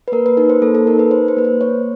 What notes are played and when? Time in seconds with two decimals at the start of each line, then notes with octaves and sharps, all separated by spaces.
0.08 B4
0.12 A#3 A#4
0.26 B4
0.37 D#4 A#4
0.50 C5
0.62 A#3 A4
0.75 A4
0.87 D#4 A#4
0.99 B4
1.11 D#4 C5
1.28 C5
1.37 A#3 B4
1.45 C5
1.61 A#3 C#5